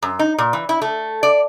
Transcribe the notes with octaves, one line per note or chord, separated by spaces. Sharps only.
F#2
D#4
A#2
E3
E4
A3
D5